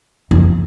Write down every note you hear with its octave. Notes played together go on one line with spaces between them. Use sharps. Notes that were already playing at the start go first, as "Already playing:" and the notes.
F2